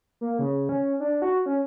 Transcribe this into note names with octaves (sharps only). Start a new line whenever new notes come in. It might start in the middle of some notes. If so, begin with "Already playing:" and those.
A#3
C#3
C#4
D4
F#4
C#4